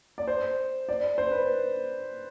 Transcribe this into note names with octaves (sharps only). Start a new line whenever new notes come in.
D5
C5
D5
C5
B4